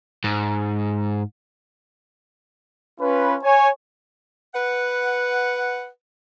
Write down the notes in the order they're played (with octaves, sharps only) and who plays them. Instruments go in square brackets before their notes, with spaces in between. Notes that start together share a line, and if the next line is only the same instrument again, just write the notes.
[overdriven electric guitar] G#2
[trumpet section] C#4 F4 B4
C#5 G#5
[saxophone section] B4 F#5